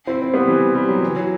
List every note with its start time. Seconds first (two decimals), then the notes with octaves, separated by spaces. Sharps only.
0.07 C4 E4
0.22 C4
0.34 G3 B3
0.47 E3 G3
0.75 G3
0.88 F#3
1.03 E3
1.16 F#3